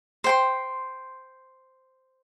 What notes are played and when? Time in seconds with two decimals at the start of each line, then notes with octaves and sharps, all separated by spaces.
0.24 C5 G5 C6